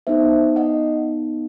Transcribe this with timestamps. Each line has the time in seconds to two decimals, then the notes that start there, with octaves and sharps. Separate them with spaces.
0.07 B3 D#4 A4 C5 E5
0.56 D#5 F#5